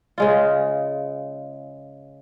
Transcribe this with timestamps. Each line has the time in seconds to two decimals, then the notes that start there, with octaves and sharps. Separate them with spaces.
0.18 C#3 G#3 F4